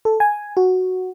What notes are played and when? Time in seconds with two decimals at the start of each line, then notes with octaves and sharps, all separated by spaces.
0.05 A4
0.20 G#5
0.57 F#4